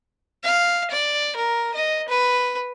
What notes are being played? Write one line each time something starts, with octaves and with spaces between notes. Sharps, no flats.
F5
D5
A#4
D#5
B4